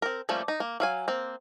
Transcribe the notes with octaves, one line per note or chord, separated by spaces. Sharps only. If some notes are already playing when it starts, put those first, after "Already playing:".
C4 A#4
F3 G3 A3 A#3 C#4
D#4
A#3
F#3 F5 G#5
A#3 C4